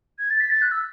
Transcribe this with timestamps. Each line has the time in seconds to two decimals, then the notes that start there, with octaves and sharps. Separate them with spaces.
0.18 G#6
0.30 A6
0.40 B6
0.50 A6
0.61 F#6
0.71 E6